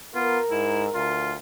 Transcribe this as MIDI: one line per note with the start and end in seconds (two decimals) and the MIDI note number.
0.15 0.38 59
0.15 0.38 65
0.15 1.39 70
0.51 0.88 44
0.51 0.84 64
0.94 1.37 38
0.94 1.34 65